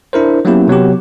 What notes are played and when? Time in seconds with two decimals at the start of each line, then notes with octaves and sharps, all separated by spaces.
0.13 D4 E4 A#4 C5
0.45 F#3 A#3 B3 C#4 E4 G4
0.68 C3 F#3 B3 G4